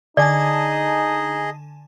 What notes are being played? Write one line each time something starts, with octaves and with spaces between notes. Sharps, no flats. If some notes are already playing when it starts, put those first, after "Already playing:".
D3 D#4 G#4 D5 D#5 G#5 A5